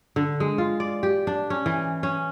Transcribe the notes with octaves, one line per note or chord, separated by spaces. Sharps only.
D3
G#3
F4
D5
G4
D4
C#4
E3
C#4